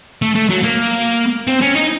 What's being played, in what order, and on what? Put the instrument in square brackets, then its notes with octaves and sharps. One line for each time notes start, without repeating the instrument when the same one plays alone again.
[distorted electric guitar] A3
A3
F#3
A#3
C4
C#4
D#4